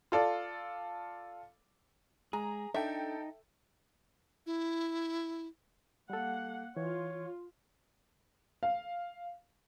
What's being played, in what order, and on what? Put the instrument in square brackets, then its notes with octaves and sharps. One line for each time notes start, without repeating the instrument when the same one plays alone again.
[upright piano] F4 A4 D5
[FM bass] G#3 [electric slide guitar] G#4 [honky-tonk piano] A#5
[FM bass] D4 [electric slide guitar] D#4 [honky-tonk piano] A4 G5 [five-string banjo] E5
[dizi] E4
[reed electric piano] G3 A4 [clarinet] A#3 [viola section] F#5
[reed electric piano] E3 [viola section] F4 [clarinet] C#5
[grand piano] F5